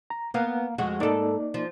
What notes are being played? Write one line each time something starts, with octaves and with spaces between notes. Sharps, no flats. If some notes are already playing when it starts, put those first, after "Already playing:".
A#5
A#3 B3 F5 A#5
F2 G#3 F#4
G#2 A#3 D#4 A4 D5
F3